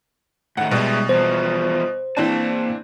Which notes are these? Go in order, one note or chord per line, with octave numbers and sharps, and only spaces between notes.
A2 D#3 F#5
B2 G3 G#3 D4 E4
E2 F3 C5
E3 A#3 C4 D4 A5